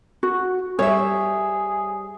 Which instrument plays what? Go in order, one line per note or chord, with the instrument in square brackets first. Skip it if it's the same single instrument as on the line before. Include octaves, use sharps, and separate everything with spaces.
[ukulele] F#4
[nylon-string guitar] G3 C5 E5 [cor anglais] G#4 [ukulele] C#5